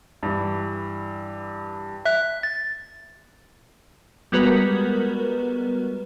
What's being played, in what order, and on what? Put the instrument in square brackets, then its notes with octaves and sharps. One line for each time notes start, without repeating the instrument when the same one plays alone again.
[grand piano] G2 E3
[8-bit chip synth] E5 F#6
A6
[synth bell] G3 G#3 B3 F#4 A#4 B4